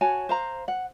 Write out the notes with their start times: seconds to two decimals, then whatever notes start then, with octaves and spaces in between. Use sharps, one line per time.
0.01 F#4 C#5 G#5 A5
0.29 C5 F5 A#5
0.68 F#5